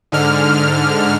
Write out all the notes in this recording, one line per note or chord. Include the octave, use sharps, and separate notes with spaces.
G#2 D3 F6